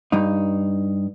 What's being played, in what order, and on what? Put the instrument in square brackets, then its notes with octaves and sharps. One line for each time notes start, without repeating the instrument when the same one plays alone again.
[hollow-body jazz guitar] G2 D#4